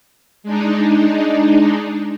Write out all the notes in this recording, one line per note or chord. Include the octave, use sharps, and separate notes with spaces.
G#3 D4 D#4